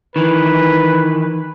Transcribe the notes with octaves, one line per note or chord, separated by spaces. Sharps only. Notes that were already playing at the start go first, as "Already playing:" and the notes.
D#3 E3 B4